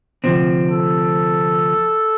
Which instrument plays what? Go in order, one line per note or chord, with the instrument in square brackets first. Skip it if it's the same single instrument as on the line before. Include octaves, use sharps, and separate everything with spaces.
[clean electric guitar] D2 C3 F3 C4
[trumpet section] A4